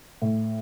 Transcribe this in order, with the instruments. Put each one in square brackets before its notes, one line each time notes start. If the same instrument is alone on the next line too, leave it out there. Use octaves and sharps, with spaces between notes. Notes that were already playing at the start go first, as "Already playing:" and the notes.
[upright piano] A2